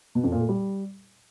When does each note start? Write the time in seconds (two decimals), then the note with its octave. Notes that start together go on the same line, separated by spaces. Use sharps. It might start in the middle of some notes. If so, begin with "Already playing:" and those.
0.15 B2
0.24 F2
0.32 A#2
0.40 A3
0.49 G3